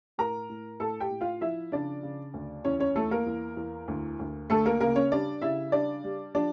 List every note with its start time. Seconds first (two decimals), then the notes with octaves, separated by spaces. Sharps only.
0.18 A2 A#4 A#5
0.49 A2
0.80 A2 A4 A5
1.00 G4 G5
1.10 A2
1.21 F4 F5
1.41 F3 E4 E5
1.72 C#3 D4 D5
2.03 C#3
2.34 D2
2.65 E2 C#4 C#5
2.80 C#4 C#5
2.95 E2 A3 A4
3.11 A#3 A#4
3.26 E2
3.57 E2
3.88 D2
4.19 D2
4.50 D2 A3 A4
4.66 A#3 A#4
4.81 C#3 A#3 A#4
4.96 C#4 C#5
5.11 G3 D4 D5
5.41 C#3 E4 E5
5.72 G3 D4 D5
6.04 G3
6.35 F3 D4 D5